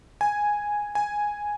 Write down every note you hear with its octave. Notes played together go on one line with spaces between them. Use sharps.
G#5
G#5